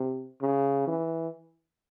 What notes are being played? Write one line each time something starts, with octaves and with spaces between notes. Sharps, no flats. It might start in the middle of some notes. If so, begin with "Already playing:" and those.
Already playing: C3
C#3
E3